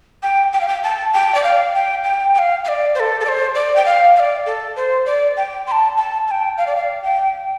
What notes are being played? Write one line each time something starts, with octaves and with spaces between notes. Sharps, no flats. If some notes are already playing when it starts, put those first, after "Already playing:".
G5
G5
F5
G5
A5
G5
D5
F5
G5
G5
G5
F5
F5
D5
C5
A4
A4
D5
C5
D5
G5
F5
F5
D5
A4
C5
D5
G5
C6
A5
A5
A5
G5
F5
D5
F5
G5